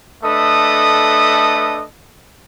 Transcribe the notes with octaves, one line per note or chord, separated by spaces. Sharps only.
A3 D4 A4 B4 D#5 D#6